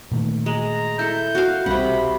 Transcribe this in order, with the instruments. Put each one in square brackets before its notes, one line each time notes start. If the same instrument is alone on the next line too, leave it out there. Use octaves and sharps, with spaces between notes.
[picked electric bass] A#2 D#3 A3
[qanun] G#3 [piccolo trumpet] A#5
[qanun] E4 A4 [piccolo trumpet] G6
[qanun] F#4 F5
[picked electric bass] B1 G3 C4 [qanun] C3 F#5 [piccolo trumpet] B5